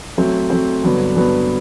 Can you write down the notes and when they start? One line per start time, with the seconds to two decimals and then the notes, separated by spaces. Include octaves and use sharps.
0.17 F#3 A3 C4
0.50 F#3 A3 C4
0.83 G2 D3 F#3 B3
1.15 G2 D3 F#3 B3